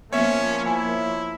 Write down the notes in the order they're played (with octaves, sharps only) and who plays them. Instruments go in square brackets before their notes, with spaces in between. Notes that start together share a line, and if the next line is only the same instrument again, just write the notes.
[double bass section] F3 A#3 [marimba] B3 [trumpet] C#4 [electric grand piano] C#5 E5
[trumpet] E4 [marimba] G#5